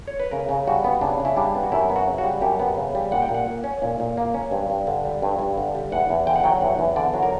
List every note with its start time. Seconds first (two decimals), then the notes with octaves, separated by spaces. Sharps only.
0.07 C#5
0.20 B4
0.31 C#3 A#4
0.49 C#3
0.68 G3 F#4
0.84 B3
1.01 C#3 D4
1.20 C#3 E4
1.37 G3 D4
1.55 B3
1.63 F#4
1.72 F#2 E4
1.90 B3
1.96 F#4
2.07 C#3
2.18 F#4
2.24 G3
2.41 F#2 G4
2.60 B3
2.77 C#3
2.95 G3
3.11 A#2 F#5
3.22 G5
3.29 A#2
3.34 F#5
3.46 A#3
3.64 C#4
3.82 A#2
4.00 A#2
4.17 A#3
4.34 C#4
4.51 G2
4.70 G2
4.87 D3
5.05 G3
5.22 G2
5.39 G2
5.57 D3
5.75 G3
5.92 E2 F#5
6.09 E2
6.27 D3 G5
6.36 F#5
6.44 F#3 G5
6.61 E2 F#5
6.79 E2
6.96 D3 D5
7.14 F#3
7.22 A#4